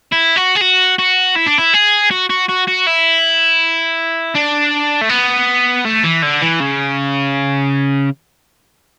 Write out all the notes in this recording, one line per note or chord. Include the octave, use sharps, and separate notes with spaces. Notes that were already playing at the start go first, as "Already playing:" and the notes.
E4
F#4
G#4
F#4
F#4
E4
D4
E4
G#4
F#4
F#4
F#4
F#4
E4
D4
A3
B3
A3
E3
D3
E3
C#3